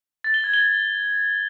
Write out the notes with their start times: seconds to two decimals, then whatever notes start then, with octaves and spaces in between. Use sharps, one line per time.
0.24 A6
0.34 G7
0.44 G#6
0.54 G7